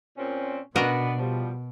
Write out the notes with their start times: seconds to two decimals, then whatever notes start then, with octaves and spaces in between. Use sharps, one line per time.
0.17 A#2 C4 C#4
0.76 B2 B3 D4 F#4 A#4 D#5
1.18 F3 G3